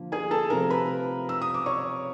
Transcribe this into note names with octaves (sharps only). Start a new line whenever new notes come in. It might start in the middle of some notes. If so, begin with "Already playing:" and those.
Already playing: D3 F3 A#3
G#4 G#5
A4 A5
C3 F3 A3 C4 A#4 A#5
B4 B5
E6
D#6
D6
C#5 C#6